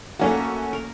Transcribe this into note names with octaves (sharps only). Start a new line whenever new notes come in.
A3 A#3 C#4 F#4 A4 A#4
A#4